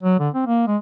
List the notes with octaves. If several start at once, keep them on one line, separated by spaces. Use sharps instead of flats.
F#3
D3
C4
A#3
G#3